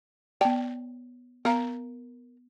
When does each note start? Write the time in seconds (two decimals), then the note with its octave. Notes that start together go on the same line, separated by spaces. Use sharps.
0.41 B3 C#5 D5 G5 A5
1.45 B3 A#4 F5 A#5